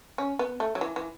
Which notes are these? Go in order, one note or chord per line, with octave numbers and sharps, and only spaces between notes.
C#4
B3
A3
F#3
E3
E3